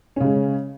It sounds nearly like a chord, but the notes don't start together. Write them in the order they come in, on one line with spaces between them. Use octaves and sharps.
C#4 C#3 G#3